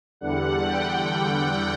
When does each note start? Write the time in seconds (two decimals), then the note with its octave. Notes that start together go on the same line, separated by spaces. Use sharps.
0.21 E2 D3 G3 F#5
0.65 G5
1.09 G5
1.38 F#5